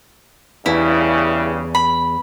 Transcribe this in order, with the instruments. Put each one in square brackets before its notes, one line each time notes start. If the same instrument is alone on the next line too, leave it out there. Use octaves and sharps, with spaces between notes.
[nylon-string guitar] E2 [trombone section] G2 C#3 [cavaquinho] E4
[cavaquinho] B5